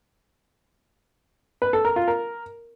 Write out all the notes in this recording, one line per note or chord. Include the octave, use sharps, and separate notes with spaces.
B4
A4
A#4
F4
A#4